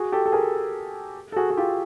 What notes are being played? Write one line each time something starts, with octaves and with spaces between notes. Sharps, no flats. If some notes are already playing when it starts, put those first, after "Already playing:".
Already playing: F#4 G#4
G4 A4
A4
G#4 A#4
A4
F#4 G#4
F#4
F4 G4